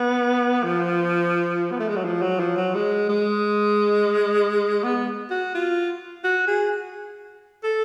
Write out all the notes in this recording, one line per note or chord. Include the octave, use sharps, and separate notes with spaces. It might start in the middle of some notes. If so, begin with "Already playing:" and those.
Already playing: B3
F3
B3
A3
G#3
F#3
F3
F#3
F3
F#3
G#3
G#3
B3
F#4
F4
F#4
G#4
A4